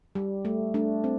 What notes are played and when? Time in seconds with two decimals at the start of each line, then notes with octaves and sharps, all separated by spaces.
0.15 G3
0.45 A3
0.74 A3 D4
1.04 C4